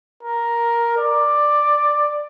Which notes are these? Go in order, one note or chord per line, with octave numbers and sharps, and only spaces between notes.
A#4
D5